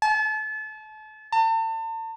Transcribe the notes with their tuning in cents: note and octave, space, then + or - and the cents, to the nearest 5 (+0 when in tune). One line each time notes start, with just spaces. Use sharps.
A5 -35
A5 +40